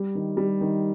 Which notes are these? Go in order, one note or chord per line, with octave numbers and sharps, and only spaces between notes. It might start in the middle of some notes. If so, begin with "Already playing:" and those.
Already playing: G3
D#3
G3
D#3